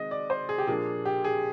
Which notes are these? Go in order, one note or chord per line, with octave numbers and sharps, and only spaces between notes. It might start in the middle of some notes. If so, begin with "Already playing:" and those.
Already playing: D#3 G#3 C4 D#5
D5
C5
G#4
G4
A#2 F3 A#3 D4 G#4
G4
G#4